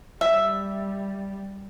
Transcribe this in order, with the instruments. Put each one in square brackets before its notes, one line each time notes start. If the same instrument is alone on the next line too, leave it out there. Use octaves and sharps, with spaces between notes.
[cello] G3 [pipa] E5